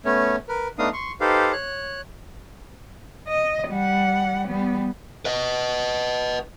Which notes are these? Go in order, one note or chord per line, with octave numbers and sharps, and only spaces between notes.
A3 B3 C#4 C#5
A#4 B4
A3 B3 D4 D#4 F5 D#6
C6 C#6
D#4 G4 A4 B4 C5 F5
C#5 F#6
D#5
G3 F#5
G3 B3
B4 D#5